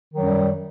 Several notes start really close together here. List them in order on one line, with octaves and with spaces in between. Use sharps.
D#3 F#3 F#2 G3